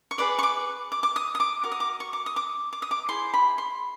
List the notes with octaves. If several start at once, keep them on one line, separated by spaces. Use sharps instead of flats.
C#6
G#4 B4 D5 D6
C#6
D6
D6
D6
D#6
D#6
D6
F#4 A#4 D6
D#6
D6
C#6
D6
D#6
D6
D6
D#6
D6
E4 G#4 C5 C6
B5
C6